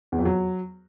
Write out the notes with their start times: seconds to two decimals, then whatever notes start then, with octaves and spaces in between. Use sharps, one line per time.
0.12 E2
0.19 F2
0.25 F#3